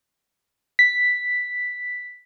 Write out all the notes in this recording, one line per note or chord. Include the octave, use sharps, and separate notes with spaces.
B6